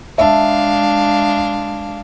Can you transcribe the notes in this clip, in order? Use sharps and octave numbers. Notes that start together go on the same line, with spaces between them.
G#3 D4 E5 F5 A5